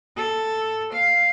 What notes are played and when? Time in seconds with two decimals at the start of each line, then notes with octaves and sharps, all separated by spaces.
0.17 A4
0.93 F5